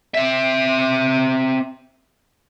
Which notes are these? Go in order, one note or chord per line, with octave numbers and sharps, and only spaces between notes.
C4 E5